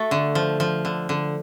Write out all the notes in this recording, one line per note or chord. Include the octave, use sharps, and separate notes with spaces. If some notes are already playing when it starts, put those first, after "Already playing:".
Already playing: A3 F#4
D3
F3
F3
D3
D3